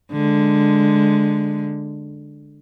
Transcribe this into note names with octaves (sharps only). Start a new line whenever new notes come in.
D3 G#3